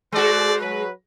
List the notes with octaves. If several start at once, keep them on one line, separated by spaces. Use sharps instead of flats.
G#3 F#4 A4 C5 D5
F#3 B4